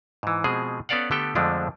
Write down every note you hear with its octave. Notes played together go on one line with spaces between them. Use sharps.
G#2 E3
B2 F3 G#3 C4 G#4
B3 C#4 A4 D5 F5 F#5
D3 A3 B3 G4 A4 G5
F2 D3 F3 G#3 A3 D4